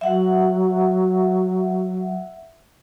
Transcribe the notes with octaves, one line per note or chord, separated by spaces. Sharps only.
F#3 E5 F#5